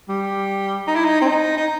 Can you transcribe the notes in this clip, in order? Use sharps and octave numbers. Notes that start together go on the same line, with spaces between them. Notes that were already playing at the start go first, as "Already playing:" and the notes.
G3
D#4
E4
D#4
C4
D#4
D#4